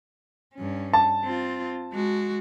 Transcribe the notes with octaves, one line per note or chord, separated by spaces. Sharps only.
G2 C#4
A5
C4 F4
G#3 F#4